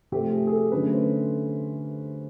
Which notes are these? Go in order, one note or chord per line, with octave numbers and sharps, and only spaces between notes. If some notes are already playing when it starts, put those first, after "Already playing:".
C3 F3 A3 G4
G#4
G#4
A4
D3 F#3 A3 C#4 B4
C5